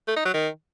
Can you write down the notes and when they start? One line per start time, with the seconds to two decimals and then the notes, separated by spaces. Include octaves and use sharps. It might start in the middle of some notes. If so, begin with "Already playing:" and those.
0.08 A3
0.17 D#4
0.25 F#3
0.34 D#3